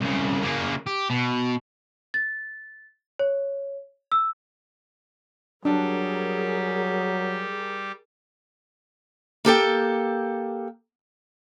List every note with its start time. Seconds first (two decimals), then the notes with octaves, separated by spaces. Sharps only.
0.01 C2 C#3
0.43 C#3 A#3
0.87 G4
1.10 B2
2.14 A6
3.19 C#5
4.12 E6
5.65 F#3 G3 D4 G4 G#4 A#4
9.45 A#3 G4 A4 G5